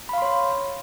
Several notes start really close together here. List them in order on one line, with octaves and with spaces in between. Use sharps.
B5 F5 C6 C#5